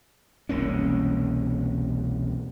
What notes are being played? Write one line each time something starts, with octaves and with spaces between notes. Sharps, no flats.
E1 C2 A#3 C#4